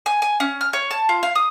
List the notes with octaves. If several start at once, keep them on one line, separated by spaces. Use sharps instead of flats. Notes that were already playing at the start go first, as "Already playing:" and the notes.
G#5
G#5
C#4
F6
C#5
A5
F4
F5
D#6